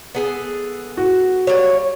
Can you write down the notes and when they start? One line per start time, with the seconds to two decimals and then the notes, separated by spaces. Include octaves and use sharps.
0.15 B3 G#4 A4
0.97 F#4
1.47 G3 A#3 C#5